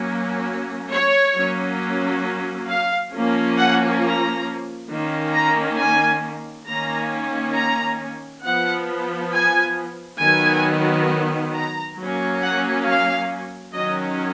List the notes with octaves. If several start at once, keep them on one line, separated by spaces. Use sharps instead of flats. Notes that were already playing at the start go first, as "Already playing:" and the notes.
Already playing: F#3 A#3 C#4
C#5
F#3 A#3 C#4
F5
F3 A#3 C#4
F#5
A#5
D#3 A#3 C#4
A#5
G#5
D#3 A#3 C#4 A#5
A#5
F3 B3 F#5
G#5
D#3 F#3 B3 G#5
A#5
F#3 A#3 C#4
F#5
F5
D#3 F#3 C#4 D#5